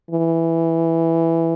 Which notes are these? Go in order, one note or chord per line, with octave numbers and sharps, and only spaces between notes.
E3